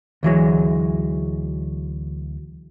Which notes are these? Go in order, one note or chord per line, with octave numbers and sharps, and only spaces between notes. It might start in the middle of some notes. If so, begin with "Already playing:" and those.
D2 E3 F#3 G#3